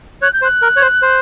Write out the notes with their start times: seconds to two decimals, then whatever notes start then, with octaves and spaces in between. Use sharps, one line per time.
0.22 C#5 F#6
0.33 G6
0.42 C5 F#6
0.62 A#4
0.77 C#5
0.81 C5
1.02 C5